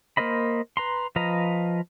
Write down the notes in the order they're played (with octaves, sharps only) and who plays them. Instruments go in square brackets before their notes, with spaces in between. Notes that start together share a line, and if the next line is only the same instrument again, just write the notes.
[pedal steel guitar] A#3 A#4 C5 D#5 B5
B4 A#5 C6
F3 B4 D#5 F5 A#5